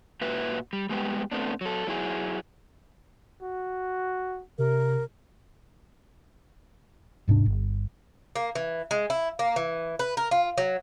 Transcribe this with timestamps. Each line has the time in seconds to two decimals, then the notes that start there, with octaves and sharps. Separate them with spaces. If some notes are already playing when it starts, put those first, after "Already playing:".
0.21 A#2 F#4 B4 E5
0.73 G3
0.89 G3 G#3 B3 G4
1.32 A2 A3 B3 C4 D4
1.61 F#3 A4
1.87 F#3 E4 G#4
3.42 F#4
4.58 C3 A#4
7.28 D#1 G#2 C3 D4
7.46 G1
8.36 A#3
8.55 E3
8.91 G#3
9.10 E4
9.39 A#3
9.56 E3
9.99 B4
10.17 A#4
10.31 F4
10.58 F#3